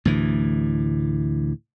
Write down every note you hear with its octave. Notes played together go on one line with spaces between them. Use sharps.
D2 A2 E3